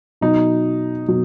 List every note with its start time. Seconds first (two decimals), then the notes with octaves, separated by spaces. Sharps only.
0.21 B2 F#3 D#4
1.08 B2 F#3